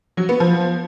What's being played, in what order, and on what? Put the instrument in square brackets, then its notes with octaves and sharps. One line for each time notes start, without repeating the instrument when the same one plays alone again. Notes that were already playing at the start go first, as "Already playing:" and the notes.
[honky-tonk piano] F#3
B3
F3